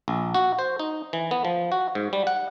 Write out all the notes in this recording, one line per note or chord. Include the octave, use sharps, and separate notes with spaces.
A#1
F#4
C5
D#4
E3
B3
F3
F#4
G#2
G3
F#5